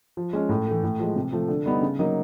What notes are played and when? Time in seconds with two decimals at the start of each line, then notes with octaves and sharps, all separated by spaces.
0.17 F3
0.33 G#3 C#4
0.49 A2
0.67 E3 A3
0.83 A2
0.99 F3 G#3
1.16 C3
1.33 F3 A3
1.48 D3
1.66 G3 B3 D#4
1.82 C#3
1.99 F#3 A#3 D#4